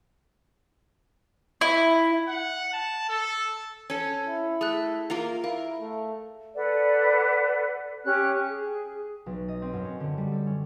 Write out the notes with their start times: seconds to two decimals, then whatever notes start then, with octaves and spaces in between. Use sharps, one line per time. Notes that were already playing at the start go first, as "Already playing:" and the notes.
1.61 E4
2.28 F#5
2.73 A5
3.08 A4
3.90 C#4 A4
4.27 E4
4.61 A3 G#4 F#6
5.10 A#3 F4 A#4 F7
5.44 E4 A#4 F5
5.80 A3
6.54 A4 B4 D5 F#5
8.04 C#4 G4 F#6
8.47 G#4
9.26 B1
9.48 D#5
9.62 C4
9.73 F#2
9.85 C#4
10.00 D3
10.18 G3
10.32 A4
10.47 C#4